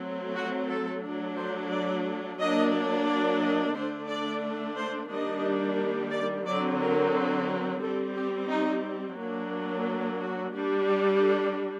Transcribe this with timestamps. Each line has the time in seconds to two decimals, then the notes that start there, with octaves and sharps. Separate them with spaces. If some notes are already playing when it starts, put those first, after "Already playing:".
Already playing: F#3 A3 C4
0.35 F#4
0.68 A4
1.03 F#3 A3 D4
1.37 C5
1.70 D5
2.39 F#3 A#3 D4 D#5
3.06 D5
3.41 D#5
3.74 D3 A3 D4 C5
4.08 D5
4.76 C5
5.09 D#3 G3 A#3 D4 D#5
6.11 D5
6.46 D3 F#3 C4 D5
6.80 A#4
7.48 A#4
7.81 G3 C4 A4
8.16 G4
8.49 D#4
9.18 F#3 A#3 D4
10.19 F#4
10.53 G3 D4
10.87 G4
11.21 A4